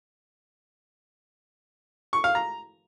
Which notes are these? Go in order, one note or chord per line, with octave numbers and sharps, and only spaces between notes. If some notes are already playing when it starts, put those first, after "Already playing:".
C#6
F5
A#5